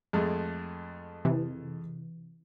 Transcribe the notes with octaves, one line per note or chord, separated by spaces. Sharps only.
F2 G#3 A3
C3 E3